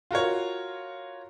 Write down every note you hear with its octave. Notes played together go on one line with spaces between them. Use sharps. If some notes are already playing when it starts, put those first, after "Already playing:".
F4 F#4 A#4 C#5